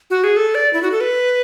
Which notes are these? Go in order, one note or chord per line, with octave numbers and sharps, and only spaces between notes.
F#4
G#4
A4
D5
E4
F#4
A4
B4